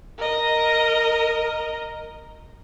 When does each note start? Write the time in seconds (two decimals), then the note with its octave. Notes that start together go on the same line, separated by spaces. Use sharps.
0.18 A#4 D#5